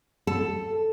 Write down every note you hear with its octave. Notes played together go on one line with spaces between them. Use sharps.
A4